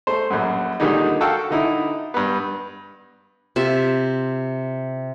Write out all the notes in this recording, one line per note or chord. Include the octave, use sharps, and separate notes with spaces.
A3 C5
A#1 F#2
A#2 D3 D#3 G3 G#3 D#4
F#4 A4 F5 G5 A5 E6
D3 D#4 E4
G2 B3
C3 F4 E5